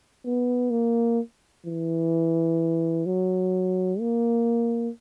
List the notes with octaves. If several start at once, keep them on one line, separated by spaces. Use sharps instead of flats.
B3
A#3
E3
F#3
A#3